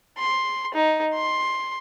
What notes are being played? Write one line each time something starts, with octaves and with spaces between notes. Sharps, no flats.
C6
D#4
C6